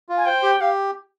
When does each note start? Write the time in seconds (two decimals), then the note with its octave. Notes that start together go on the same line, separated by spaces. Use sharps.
0.09 F4
0.17 G#5
0.26 C5 G5
0.43 G4
0.60 G4 F5